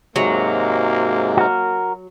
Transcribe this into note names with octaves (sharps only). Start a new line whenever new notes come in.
G#2 C3 F#3 G#3 A#3
F#4 A#4